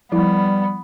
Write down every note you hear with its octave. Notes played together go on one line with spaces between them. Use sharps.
F3 G3 B3 E4